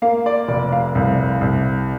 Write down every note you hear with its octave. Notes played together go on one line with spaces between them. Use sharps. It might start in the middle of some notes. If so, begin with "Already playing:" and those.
A#3 F5
D5
F1 D5
F5
C2
C2